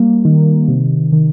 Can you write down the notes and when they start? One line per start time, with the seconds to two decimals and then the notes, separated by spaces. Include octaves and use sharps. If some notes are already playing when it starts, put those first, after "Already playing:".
Already playing: G3 A#3
0.25 D#3
0.68 C3
1.12 D#3